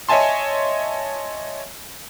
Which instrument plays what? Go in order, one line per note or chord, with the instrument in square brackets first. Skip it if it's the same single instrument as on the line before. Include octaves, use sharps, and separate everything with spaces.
[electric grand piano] C#5 D#5 E5 G#5 A5 C6